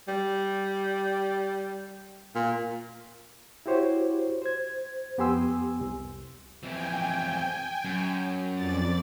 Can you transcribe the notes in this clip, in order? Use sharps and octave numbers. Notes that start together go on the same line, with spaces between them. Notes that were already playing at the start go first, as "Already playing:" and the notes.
G3
A#2
E4 F#4 G4 C5 C#5
C5 G#6
F2 B3 G4 G#5 C6 E6
C2
F2 E3 G5 G#5
F#2
F2 D5 A6